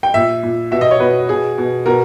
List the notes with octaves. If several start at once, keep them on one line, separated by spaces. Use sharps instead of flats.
G5
A#2 E5
A#2
B2 E5
D#5
C#5
B2 B4
B2 G#4
B2
B2 A#4